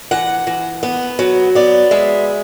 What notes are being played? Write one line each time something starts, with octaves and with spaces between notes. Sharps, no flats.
E3 F#5
E3
B3
F#3
B3 D5
G#3 E5